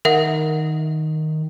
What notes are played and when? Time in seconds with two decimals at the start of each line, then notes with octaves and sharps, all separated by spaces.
0.05 D#3 A#4 E5 F#5